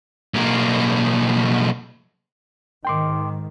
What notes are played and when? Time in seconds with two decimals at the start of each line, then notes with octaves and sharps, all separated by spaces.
0.34 B1 A#3
2.85 G#2 D#3 G5 C6 D6